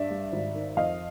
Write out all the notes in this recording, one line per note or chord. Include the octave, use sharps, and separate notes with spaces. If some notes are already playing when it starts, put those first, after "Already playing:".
Already playing: G2 D5 E5
G3
G#1
D#3
F2 D#5 F5